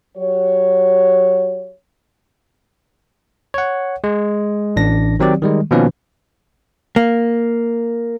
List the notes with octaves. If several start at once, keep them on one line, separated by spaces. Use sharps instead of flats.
F#3 F#4 G4 C#5
C#5 F#5
G#3
A1 D4 A#6
D#3 F#3 C4 G4 D5
D#3 G3 G#3
B2 D#3 F3 A#3 C#4 B4
A#3